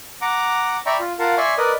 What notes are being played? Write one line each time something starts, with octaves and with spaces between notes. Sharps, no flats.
F#5 A#5 D6
D5 E5 G5 A#5 B5 C#6
F4
F4 A#4 F5 F#5 A5
D5 E5 G#5 C6 C#6
A#4 B4 D5 D#5 D#6